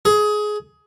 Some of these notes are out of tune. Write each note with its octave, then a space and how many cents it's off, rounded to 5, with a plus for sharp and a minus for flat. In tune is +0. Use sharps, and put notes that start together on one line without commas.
G#4 +20